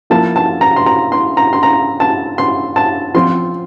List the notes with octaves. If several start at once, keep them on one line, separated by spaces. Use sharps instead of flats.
F3 A#3 E4 A5
A5
A#5
C6
A#5
C6
A#5
C6
A#5
A5
C6
A5
F3 C4 F4 C6